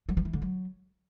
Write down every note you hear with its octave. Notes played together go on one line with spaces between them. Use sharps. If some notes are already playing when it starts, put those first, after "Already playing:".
F#3
F3
E3
D3
F#3